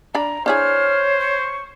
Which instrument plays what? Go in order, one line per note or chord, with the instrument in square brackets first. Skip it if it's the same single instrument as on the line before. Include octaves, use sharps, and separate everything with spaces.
[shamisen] D4 D5 B5 [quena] A#5
[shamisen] D4 E4 G#4 [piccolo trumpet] C5 [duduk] C#5 [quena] F6
[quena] C#6